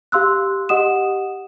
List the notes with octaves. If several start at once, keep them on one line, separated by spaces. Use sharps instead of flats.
G4 F5 C6 E6 F#6
G4 D#5 F#5 D#6 E7